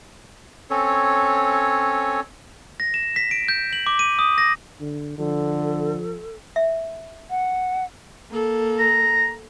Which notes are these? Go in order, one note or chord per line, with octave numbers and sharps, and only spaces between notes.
C4 C#4 A4 C#5
A#6
E7
B6
D7
G6
F#7
D6
D#7
D#6
A#6
D3
D3 F3 A4
E5
F#5
A#3 A4
A#5